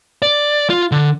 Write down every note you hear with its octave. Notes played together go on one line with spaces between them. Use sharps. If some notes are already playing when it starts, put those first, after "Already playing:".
D5
F4
D3